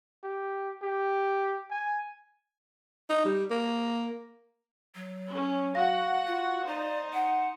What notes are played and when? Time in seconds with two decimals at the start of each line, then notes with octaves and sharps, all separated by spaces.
0.24 G4
0.83 G4
1.71 G#5
3.10 D#4
3.25 G3
3.51 A#3
4.95 F#3
5.29 C#4
5.75 F#4 F5 F#5 A#6
6.27 F4
6.67 D#4 C5 D5
7.13 F#5